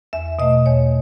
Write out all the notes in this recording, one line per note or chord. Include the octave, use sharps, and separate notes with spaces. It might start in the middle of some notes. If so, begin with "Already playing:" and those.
E2 E5
B2 A3 D#5
E2 C#5